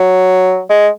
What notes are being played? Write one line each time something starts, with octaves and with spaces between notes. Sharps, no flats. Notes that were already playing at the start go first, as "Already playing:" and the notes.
Already playing: F#3
G#3